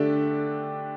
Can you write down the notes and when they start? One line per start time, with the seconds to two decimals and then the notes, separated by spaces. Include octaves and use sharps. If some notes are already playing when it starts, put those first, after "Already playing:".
Already playing: D3 A3 D4 G4